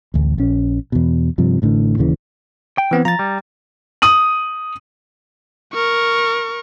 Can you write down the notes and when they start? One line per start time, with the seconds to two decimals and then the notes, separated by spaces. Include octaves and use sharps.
0.14 A1 D2
0.38 A#1 C#4
0.92 E2 B2
1.38 G2 C3 F3
1.62 A1 A2 D3
1.98 D#1 D#2 C#3 E3
2.78 G5
2.91 E3 B3 C4
3.05 F3 A#5 A6
3.19 G3
4.02 D#6 D#7 F#7
5.74 A#4 C#6